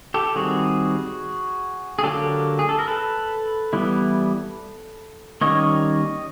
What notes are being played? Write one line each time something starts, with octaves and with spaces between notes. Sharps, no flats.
G4 A4
D#3 G3 C4 F#4 G#4
G#4
D3 F#3 A#3 G4 A4
G#4
A4
A#4
A4 B4
E3 G3 B3 E4
D#3 G3 A#3 C#4 C#5 D#5